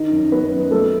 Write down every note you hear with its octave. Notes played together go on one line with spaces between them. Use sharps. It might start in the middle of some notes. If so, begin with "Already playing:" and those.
Already playing: D#3 D#4 D#5
F#2
F#2 B3 B4
F#2
F#3 A3 A4